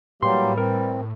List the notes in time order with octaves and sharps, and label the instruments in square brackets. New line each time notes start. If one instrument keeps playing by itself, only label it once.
[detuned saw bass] A2 [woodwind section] E3 G3 [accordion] F#3 A#3 G4 [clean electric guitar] C6
[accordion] C4 [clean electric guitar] A#4